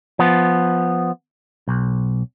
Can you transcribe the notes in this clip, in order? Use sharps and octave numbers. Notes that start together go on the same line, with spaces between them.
F3 B3
B1